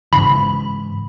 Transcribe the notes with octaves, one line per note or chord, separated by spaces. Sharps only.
G#2 C#3 E3 B5